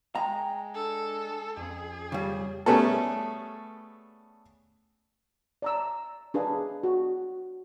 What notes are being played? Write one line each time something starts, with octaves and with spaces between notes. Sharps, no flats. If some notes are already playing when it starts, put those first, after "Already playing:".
G#3 G5 A#5
D4 A4
F2 C#4 G#4
C#3 G3
G3 A3 B3 C#4 G#4 A4
D5 A#5 E6
D4 G#4 B4 F5
F#4